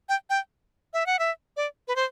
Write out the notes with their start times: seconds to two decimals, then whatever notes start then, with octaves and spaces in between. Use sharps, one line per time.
0.09 G5
0.30 G5
0.94 E5
1.06 F#5
1.19 E5
1.57 D5
1.88 B4
1.96 C5